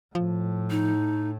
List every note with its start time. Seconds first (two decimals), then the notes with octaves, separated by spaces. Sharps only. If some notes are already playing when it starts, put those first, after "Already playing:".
0.15 A2 F3
0.70 D#4